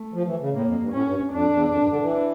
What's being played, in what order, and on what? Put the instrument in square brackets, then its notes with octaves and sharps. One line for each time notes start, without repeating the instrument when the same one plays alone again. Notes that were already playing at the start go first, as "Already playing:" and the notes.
Already playing: [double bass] A3
[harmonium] F3
E3
C#3
[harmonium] A2 [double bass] A#3
[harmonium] F2
G2
[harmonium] A2 [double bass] C#4
[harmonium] G2
[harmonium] F2 [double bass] D4
[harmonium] E2
F2
G2
D3
E3